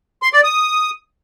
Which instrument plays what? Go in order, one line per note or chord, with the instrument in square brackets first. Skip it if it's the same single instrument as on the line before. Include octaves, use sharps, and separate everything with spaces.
[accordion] C6
D5
D#6